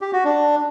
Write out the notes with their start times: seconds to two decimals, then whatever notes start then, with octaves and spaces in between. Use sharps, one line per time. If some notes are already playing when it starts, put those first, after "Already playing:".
0.01 G4
0.13 F#4
0.24 D4